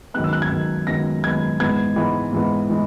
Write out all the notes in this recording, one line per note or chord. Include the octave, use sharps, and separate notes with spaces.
F#2 D#3 G#3 B3 F#6
E6
F#6
G#6
F#2 D#3 G#3 B3
F#2 D#3 G#3 B3 A#6
F#2 D#3 G#3 B3 G#6
G#2 E3 G#3 B3 G#6
G#2 E3 G#3 B3
G#2 E3 G#3 B3
E3 G#3